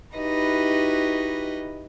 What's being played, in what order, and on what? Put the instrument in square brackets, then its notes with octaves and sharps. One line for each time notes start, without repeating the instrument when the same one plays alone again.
[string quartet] D#4 E4 F#4 G4 B4 D#5